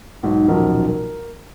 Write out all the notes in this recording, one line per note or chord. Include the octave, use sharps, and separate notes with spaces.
B1 G#2
D#1 B1 F3 A#4
A#4